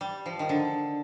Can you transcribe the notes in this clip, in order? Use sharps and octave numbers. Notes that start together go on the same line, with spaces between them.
G3
F3
D#3
D3